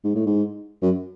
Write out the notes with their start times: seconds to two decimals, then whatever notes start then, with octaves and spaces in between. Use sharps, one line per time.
0.04 G#2
0.15 A2
0.26 G#2
0.82 F#2